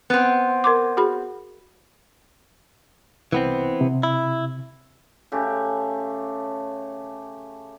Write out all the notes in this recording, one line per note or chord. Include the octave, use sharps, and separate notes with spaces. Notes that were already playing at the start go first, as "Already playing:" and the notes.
B3 C4
A#4 C6 D6
F#4 G#4 B5
C2 E3 B3 C4
C3
E4
C#3 A3 G4